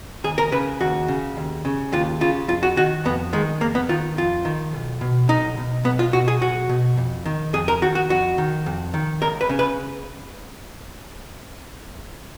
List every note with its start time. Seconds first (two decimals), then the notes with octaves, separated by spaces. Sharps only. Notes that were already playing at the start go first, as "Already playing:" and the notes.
0.24 D#2 G#4
0.38 A#4
0.52 C#3 B4
0.80 D#2 F#4
1.08 C#3
1.37 D#2
1.65 C#3
1.93 D#2 F4
2.21 C#3 F4
2.48 F2 F4
2.63 F#4
2.77 D#3 F#4
3.05 F2 B3
3.33 D#3 G#3
3.61 F2 A#3
3.75 B3
3.89 D#3 F4
4.17 F2 F4
4.45 D#3
4.73 B1
5.01 B2
5.29 B1 D#4
5.57 B2
5.85 B1 B3
5.99 F4
6.13 B2 F#4
6.28 G#4
6.41 B1 F#4
6.69 B2
6.98 F2
7.26 D#3
7.53 F2 G#4
7.68 A#4
7.82 D#3 F#4
7.95 F#4
8.09 F2 F#4
8.38 D#3
8.66 F2
8.94 D#3
9.22 C#2 A#4
9.41 B4
9.49 C#3
9.59 B4